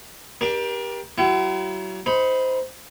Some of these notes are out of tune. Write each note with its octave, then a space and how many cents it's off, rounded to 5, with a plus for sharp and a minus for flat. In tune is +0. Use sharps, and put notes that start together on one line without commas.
D4 +0 G4 +5 A#4 +35
F#3 +40 E4 +40 F#5 +45
D#4 +25 C5 -15 B5 +0